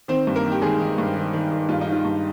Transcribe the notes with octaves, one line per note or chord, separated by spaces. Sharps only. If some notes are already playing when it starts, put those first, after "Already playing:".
D#3 C4 C5
G2
A#3 A#4
D#3
G4
D#3 G#3 G#4
D#3
G2
D#3
D#3
D#3
G2 F4
D#4
D#3
F4
G2